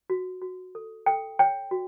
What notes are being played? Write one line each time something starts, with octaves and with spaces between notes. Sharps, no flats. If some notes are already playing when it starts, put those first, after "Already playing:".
F#4
F#4
A4
A4 G5
C#5 G5
F#4